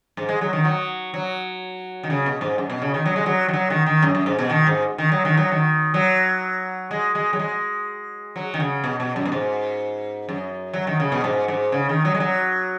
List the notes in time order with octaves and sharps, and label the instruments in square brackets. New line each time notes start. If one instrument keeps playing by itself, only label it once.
[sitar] G#2
G#3
F#3
D#3
F#3
F#3
D#3
C#3
B2
G#2
F#2
B2
C#3
D#3
F#3
G#3
F#3
D#3
F#3
D#3
D#3
F#2
F#2
G#2
B2
D#3
G#2
D#3
F#3
D#3
F#3
D#3
F#3
G#3
G#3
F#3
G#3
F#3
D#3
C#3
B2
B2
F#2
B2
G#2
F#2
F#3
D#3
C#3
B2
G#2
G#2
C#3
D#3
F#3
G#3
F#3